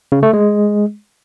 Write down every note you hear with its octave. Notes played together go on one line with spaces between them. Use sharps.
C#3
A3
G#3